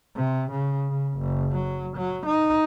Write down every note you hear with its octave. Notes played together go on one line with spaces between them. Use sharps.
C3
C#3
C#3
F#1
F#3
F#3
D#4